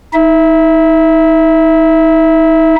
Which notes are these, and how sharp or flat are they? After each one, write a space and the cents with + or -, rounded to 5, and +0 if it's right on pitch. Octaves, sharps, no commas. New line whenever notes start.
D#4 +30 E5 +0